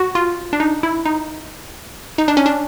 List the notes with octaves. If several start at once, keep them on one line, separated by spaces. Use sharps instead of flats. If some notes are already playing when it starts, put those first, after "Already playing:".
Already playing: F#4
F4
D4
D#4
E4
D#4
D#4
D4
C#4
D4